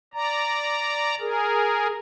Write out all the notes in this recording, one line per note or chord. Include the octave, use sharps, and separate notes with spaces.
D5 A#5
G#4 A#4